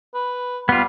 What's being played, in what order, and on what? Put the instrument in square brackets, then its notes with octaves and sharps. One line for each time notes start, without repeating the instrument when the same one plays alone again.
[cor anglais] B4
[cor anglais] G3 [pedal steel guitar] B3 F4